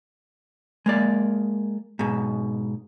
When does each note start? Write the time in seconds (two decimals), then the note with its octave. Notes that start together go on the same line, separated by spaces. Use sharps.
0.86 G#3 A#3 D5
1.99 G#2 B2